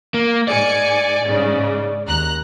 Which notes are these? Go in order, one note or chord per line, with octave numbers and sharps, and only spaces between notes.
A#3
G#2 D5 G#5 C#7
G#2 C#3
D#2 A#5 F#6